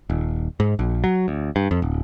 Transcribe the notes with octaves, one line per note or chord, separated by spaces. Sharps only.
D#1
G#2
A#1
F#3
D2
G2
F2
D1